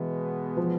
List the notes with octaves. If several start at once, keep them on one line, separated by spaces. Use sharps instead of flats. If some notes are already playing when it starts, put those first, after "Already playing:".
Already playing: B2 E3 G#3 B3
F3